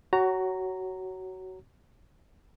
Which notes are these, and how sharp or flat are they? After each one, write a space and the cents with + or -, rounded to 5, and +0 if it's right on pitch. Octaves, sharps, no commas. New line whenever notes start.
F#4 +20 C#5 +0 A#5 -10